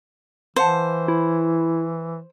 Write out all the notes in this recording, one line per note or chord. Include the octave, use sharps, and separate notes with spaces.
E3 C5 F5 F#5 A5
E4